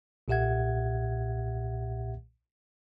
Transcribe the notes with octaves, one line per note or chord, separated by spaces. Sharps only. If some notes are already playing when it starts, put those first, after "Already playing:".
B1 A#2 G4 E5 F#5 G#6